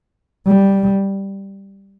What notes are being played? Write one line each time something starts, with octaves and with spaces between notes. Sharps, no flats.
G3